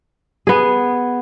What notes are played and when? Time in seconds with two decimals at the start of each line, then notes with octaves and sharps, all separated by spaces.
0.47 B3 G#4